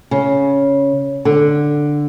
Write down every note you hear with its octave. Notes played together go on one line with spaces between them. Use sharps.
C#3
D3